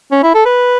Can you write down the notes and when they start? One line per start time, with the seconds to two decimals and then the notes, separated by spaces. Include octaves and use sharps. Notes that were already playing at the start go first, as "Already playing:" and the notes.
0.11 C#4
0.23 E4
0.34 A4
0.46 B4